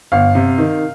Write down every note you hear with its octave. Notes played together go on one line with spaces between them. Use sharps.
G1 F5
C3
D#3